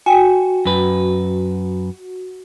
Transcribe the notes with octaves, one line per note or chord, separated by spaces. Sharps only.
F#4 G5 G#5
F#2 B4